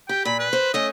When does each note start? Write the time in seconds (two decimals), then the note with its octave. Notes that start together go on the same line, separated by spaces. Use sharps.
0.09 G4 G5
0.25 A#2 B5
0.39 B4
0.53 C5
0.74 A3 C#4 D#5